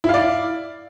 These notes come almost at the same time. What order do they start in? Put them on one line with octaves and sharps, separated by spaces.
E4 F5 D5